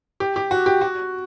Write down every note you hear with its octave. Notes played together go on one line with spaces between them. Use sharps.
G4
G4
F#4
G4
F#4